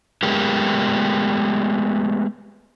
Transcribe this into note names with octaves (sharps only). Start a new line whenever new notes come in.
G#3 A3 B3 G4 G#4 A#4